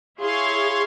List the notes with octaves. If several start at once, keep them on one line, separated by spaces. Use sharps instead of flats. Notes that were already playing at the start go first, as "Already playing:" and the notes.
E4 G#4 C#5 F5 C6